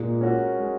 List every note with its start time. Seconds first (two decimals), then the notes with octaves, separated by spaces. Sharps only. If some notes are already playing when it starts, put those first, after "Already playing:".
Already playing: A#2 G#3
0.21 C#4 F#4 A#4
0.60 G#3